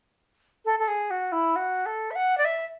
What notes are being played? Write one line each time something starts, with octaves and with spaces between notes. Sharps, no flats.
A4
A4
G#4
F#4
E4
F#4
A4
E5
F#5
D5
E5